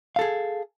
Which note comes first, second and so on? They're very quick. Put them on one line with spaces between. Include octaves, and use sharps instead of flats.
F5 A4 G#4